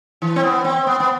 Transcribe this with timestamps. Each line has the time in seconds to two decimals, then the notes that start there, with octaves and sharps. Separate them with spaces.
0.22 E3
0.36 C4
0.43 B3
0.64 C4
0.87 B3
1.00 B3